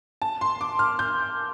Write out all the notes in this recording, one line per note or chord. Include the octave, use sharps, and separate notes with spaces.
A5
C6
D6
F6
G6